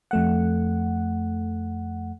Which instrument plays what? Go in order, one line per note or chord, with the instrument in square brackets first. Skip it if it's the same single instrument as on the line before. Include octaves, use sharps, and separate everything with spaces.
[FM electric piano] F2 A3 F#5